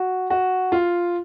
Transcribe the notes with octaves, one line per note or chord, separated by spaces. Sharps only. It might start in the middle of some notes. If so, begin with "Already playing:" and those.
Already playing: F#4
F#4
F4